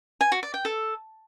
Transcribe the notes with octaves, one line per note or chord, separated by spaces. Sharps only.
G#5
F#4
D5
G5
A4